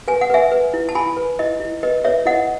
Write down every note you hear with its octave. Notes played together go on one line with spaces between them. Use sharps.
B4 G#5
F#5
B4 E5 G#5
B4
E4
A5
E4 G#5 B5
B4
E4 D#5
E4
B4 D#5
B4 C#5 E5
E4 D#5 F#5